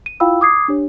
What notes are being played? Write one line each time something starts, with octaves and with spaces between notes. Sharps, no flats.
D#7
E4 F4 F5 G5 B5 E6
D6 D#6 G#6 C7
D4 G4 C#5